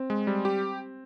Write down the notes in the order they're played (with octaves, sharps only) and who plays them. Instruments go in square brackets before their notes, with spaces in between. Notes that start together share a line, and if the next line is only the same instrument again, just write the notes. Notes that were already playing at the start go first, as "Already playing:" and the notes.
Already playing: [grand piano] C4
[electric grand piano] G#3
G3
G4